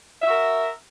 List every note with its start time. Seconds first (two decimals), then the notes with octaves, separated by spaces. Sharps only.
0.22 E5
0.26 F#4
0.29 A#4